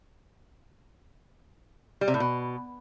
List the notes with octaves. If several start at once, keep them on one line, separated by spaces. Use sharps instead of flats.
G3
C3
A2
B2